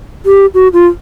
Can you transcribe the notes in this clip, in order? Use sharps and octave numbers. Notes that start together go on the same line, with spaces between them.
G4
F#4
F4